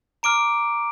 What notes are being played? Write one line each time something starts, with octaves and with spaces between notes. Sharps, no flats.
A#5 D6 F6 D7